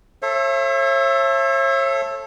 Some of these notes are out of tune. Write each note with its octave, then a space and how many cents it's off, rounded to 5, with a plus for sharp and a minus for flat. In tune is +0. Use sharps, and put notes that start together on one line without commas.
A4 +0 C#5 -40 E5 +30